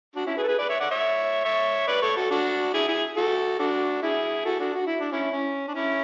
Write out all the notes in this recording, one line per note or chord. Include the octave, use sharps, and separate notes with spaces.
D4 F#4
C#4 E4
G#4 B4
A4
G#4 B4
B4 D5
C#5 E5
D5 F#5
C#5 E5
C#5 E5
B4 D5
A4 C#5
F#4 A4
D4 F#4
E4 G#4
E4 G#4
F#4 A4
D4 F#4
E4 G#4
F#4 A4
D4 F#4
F#4
E4
D4
C#4 E4
C#4
D4
C#4 E4